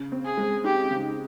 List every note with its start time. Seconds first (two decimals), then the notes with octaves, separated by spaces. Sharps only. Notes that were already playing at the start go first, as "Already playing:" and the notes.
Already playing: C#3
0.12 C4
0.25 G#4
0.37 G#3
0.64 D#4 G4
0.90 C#3